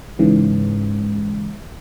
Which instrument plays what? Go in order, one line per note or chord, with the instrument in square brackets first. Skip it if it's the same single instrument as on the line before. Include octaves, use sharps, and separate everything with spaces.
[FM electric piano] G#2 C#3 E3